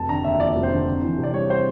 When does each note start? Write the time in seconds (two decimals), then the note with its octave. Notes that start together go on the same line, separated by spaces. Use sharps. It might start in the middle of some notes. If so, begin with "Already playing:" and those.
Already playing: F1 A5
0.09 D3 A#5
0.24 D#2 E5
0.40 F3 D5
0.56 F1
0.63 C5
0.72 D3
0.87 F2
1.02 E3
1.18 C3
1.23 D5
1.33 G3 C#5
1.50 C5